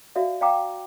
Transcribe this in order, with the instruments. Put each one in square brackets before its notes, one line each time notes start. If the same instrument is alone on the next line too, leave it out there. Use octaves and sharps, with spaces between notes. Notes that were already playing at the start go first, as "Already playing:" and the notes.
[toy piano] F#4 D5 E5 F5
D5 F5 G5 A#5 D6